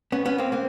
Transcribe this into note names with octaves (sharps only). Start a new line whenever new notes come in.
B3 C#4
B3 C#4
A#3 C4
A#3 C4